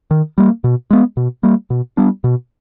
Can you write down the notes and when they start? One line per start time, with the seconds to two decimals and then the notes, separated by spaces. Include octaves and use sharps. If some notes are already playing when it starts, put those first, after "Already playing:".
0.11 D#3
0.38 G3 A#3
0.64 B2
0.91 G#3 B3
1.17 B2
1.43 G3 A#3
1.70 B2
1.97 G3 B3 D4
2.24 B2